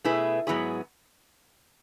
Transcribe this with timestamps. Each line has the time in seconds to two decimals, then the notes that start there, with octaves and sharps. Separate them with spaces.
0.04 B2 A3 E4 G#4 B4
0.47 G#2 F#3 B3 E4 G#4